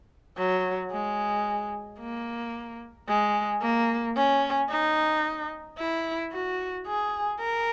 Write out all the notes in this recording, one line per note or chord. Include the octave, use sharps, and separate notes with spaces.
F#3
G#3
A#3
G#3
A#3
C#4
D#4
E4
F#4
G#4
A#4